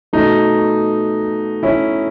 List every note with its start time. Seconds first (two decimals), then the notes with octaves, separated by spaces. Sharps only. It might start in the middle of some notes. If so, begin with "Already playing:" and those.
0.13 B2 A3 D#4
1.63 C#4 E4